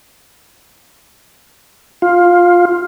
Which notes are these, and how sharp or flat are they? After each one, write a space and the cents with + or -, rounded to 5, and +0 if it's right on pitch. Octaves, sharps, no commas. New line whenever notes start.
F4 +10